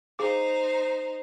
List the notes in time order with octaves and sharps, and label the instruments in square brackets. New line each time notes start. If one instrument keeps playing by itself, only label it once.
[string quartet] D#4 C5 [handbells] G#4 F5 D6